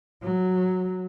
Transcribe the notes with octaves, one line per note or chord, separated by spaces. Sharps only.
F#3